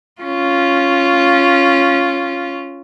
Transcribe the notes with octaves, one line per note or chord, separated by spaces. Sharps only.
C#4 F4